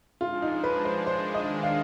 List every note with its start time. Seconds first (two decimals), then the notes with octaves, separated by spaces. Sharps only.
0.21 F3 G#3 D4 F4
0.42 D#4
0.64 B4
0.85 C5
1.06 D#3 G#3 D4 C5
1.34 D#5
1.63 F5